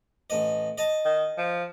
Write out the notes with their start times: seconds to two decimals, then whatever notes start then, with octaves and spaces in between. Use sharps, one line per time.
0.30 A1 D#5
0.78 D#5 A5
1.05 D#3
1.37 F3